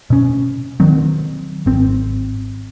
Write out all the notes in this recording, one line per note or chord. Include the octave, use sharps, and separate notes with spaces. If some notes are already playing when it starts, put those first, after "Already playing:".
B2 C#4
D#3 F#3 C4
G#1 C4